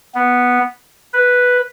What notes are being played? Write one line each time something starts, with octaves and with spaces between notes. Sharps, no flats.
B3
B4